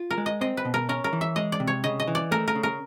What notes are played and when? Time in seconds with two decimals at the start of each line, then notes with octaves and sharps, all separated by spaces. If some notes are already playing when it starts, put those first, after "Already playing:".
Already playing: F4
0.11 A#4
0.18 G#3
0.26 D#5
0.41 C4 D#5
0.57 B4
0.65 B2
0.74 A#4
0.89 C#4 A#4
1.04 A#4
1.13 E3
1.21 E5
1.36 G#3 D#5
1.52 D5
1.60 C3
1.67 C#5
1.84 C#3 D#5
2.00 D#5
2.07 E3
2.15 D5
2.31 A3 A#4
2.48 A#4
2.55 C#3
2.63 A#4